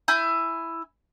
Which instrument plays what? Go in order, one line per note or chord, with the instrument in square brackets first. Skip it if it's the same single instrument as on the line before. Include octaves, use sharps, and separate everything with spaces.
[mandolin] E4 G#5 G6